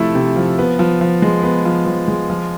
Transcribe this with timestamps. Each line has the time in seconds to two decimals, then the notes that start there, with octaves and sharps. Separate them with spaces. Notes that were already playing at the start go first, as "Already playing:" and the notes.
Already playing: C3 F3 A3 E4
0.15 C3
0.36 F3
0.59 B3
0.79 F3
1.01 F3
1.22 G#3
1.43 B3
1.65 F3
1.86 F3
2.08 G#3
2.30 F3